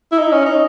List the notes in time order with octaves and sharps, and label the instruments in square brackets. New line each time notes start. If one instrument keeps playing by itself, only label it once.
[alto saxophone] E4
D#4
C#4
D#4